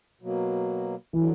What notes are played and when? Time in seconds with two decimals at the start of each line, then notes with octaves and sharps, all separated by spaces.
0.21 B2 F#3 A#3
1.13 D3 E3 F#3